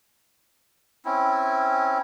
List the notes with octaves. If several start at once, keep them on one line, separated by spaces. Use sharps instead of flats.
C4 C#4 E4